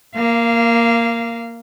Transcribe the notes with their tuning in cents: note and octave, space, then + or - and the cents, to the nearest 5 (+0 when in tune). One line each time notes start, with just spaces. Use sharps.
A#3 +0 F5 -20